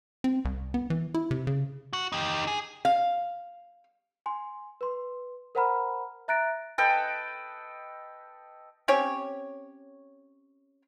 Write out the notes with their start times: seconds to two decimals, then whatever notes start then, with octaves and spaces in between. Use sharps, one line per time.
0.24 C4
0.45 C2
0.74 B3
0.90 E3
1.14 E4
1.31 C3
1.47 C#3
1.93 F#4
2.12 D#4 G4
2.47 G#4
2.85 F5
4.26 G#5 C6
4.81 B4 C6
5.55 A#4 C5 F#5 A#5 B5 F6
6.28 E5 A#5 F#6 A6 A#6 D7
6.78 A4 B4 D#5 G5
8.88 C4 C#4 G4 C#5